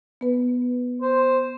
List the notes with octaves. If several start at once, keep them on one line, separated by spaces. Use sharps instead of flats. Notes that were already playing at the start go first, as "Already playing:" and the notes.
B3 B4
C5